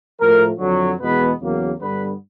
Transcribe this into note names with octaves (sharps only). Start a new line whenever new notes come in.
A2 F3 A3 A#4
F2 D3 F#3
E2 B2 G#3 B3 B4
E2 C#3 F#3 A#3
G2 D3 G3 B3 B4